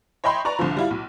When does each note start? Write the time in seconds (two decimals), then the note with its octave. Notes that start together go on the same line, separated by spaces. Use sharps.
0.24 C#5 D#5 E5 G5 B5 C6
0.45 B4 D5 A#5 C#6
0.59 C2 D3 F3
0.77 G3 E4 F4
0.90 B1